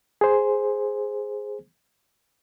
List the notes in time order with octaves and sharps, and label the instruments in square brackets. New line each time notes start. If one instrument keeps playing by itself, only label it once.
[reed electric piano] G#4 C5